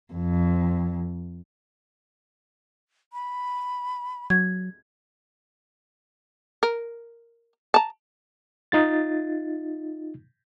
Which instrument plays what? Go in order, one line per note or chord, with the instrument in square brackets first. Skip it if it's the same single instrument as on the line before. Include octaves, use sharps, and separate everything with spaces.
[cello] F2
[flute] B5
[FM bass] F#3 [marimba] G#6
[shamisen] A#4
A5 A#5
[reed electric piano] D#4 F4 A6